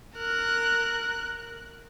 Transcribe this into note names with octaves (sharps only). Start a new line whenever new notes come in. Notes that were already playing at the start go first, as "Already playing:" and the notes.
A#4 F#6